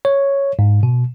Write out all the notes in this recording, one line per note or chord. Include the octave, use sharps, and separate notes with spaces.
C#5
G#2
B2